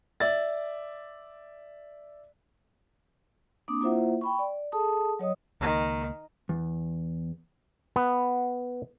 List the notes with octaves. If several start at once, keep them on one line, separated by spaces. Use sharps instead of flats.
D5 E5 A6
A#3 C4 D4 D6 D#6
A#3 E4 F4 C5 E5 F#5
G5 B5 C#6
D5
G#4 A4 A5 D#6
F#3 C#5 D#5 D#6
C#2 D#3 A#3
E2
B3